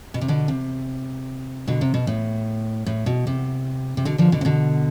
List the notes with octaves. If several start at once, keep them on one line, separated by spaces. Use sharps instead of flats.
B2
C3
B2 D3
C3
B2 D3
C3
B2
A2
A2
B2
C3
C3
B2 D3
D3 F3
B2 D3
C3
B2 D3